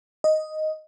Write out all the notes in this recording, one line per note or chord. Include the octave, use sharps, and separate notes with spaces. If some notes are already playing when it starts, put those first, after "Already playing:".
D#5